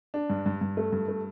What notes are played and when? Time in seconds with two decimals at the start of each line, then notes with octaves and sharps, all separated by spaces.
0.14 D4
0.30 G2
0.46 G2
0.61 G2
0.77 A3
0.92 G2
1.08 A3